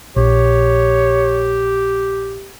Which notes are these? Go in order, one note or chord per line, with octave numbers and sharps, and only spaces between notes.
A#1 G4 C#5